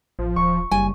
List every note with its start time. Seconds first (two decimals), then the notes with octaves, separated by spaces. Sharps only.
0.19 A1 F3
0.36 D#1 C#6
0.71 F#1 G3 G#5